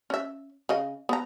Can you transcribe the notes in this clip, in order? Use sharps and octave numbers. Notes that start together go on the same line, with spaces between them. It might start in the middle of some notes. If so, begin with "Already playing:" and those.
C#4 E5
C#3 D#5
B3 A#5